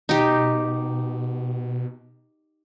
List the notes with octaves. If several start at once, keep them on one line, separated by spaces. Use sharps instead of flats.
B2 D#4 G4